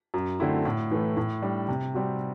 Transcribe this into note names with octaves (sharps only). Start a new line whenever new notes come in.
F#2
D3 A3 C4 E4
A2
E3 A3
A2
G3 D4
C3
G3 C4 F#4